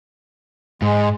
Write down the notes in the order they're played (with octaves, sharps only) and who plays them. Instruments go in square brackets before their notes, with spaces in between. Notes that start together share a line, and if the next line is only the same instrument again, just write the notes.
[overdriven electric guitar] G#2 [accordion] G#3